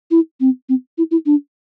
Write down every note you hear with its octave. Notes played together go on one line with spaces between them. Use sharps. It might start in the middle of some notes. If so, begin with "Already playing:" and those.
E4
C4
C4
E4
E4
D4